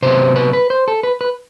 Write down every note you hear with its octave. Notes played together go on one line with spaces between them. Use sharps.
C3 F#3 B3 C5
B4
B4
C5
A4
B4
B4